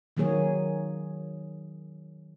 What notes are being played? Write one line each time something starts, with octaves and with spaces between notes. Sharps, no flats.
D#3 F#3 A#3 G#4 C#5